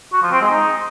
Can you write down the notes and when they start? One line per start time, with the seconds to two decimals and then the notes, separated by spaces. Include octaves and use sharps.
0.13 F#4
0.22 F3
0.32 C4
0.41 G#3
0.51 D#4